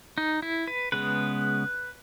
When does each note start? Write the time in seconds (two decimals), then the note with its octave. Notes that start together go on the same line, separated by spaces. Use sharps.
0.18 D#4
0.42 E4
0.68 B4
0.92 C#3 G#3 B3 B4